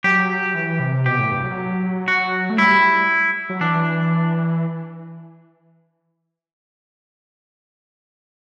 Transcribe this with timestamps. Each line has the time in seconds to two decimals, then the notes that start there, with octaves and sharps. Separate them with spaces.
0.04 F#3 G4
0.54 E3
0.80 C3
1.06 B2 G4
1.19 A2
1.31 G2
1.44 F#3
2.08 F#4
2.50 A3
2.58 G3 E4
3.50 F#3
3.61 E3 D4